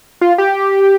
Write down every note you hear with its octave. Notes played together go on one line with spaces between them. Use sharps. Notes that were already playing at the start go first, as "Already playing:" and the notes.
F4
G4